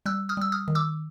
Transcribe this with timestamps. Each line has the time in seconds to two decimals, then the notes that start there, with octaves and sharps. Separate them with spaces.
0.06 G3 E6 F#6
0.29 D#6 F6
0.37 G3 E6
0.52 D#6 F6
0.68 D#3
0.75 D6 E6